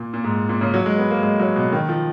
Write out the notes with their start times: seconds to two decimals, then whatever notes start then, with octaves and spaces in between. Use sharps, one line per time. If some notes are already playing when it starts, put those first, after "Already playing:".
Already playing: A#2
0.14 A#2
0.24 G#2
0.49 A#2
0.61 C#3
0.74 F#3
0.86 G#3
0.98 B3
1.11 A#3
1.23 G#3
1.40 F#3
1.56 B2
1.72 D#3
1.89 F3